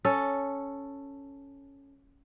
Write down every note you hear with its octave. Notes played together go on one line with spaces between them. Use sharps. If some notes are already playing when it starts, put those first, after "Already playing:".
C#4 A4